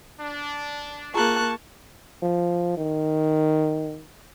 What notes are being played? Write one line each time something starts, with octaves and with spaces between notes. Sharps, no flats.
D4
A#3 F4 G#4 A5 A#5 C#6 F#6
F3
D#3